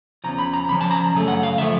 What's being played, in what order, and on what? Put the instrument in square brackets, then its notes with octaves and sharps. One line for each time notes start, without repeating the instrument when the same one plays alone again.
[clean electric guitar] E2 C#3 F3 A#5
B5
A#5
E2 C#3 F3 B5
A5
A#5
F#2 C#3 A3
F#5
F5
C#3 F3 A3 E5